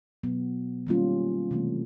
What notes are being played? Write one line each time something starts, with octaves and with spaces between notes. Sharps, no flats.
B2 F#3 B3
D#3 G3 A#3 C#4 F4
C3 E3 A3 C4